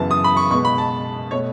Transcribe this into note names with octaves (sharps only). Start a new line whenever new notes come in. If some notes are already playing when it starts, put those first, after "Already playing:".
Already playing: F#2 C#3 E3 B3 A5
D#6
B5
C#6
B2 G#3 B3 C#6
B5
A5
B2 A3 C#5